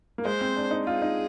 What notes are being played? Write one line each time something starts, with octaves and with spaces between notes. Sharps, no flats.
A#3
G#3 C5
C4
D4
D#4
F4 G#4
D#4